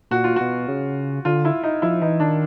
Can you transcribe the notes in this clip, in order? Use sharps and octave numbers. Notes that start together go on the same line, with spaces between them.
A#2 F#4
F4
B2 F#4
C#3
D3 F4
E4
D#4
F3 E4
E3 D#4
D#3 D4